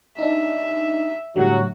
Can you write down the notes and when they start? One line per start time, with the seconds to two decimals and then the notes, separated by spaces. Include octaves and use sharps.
0.18 D4 D#4 E5
1.36 A2 D3 F#3 G3 F#4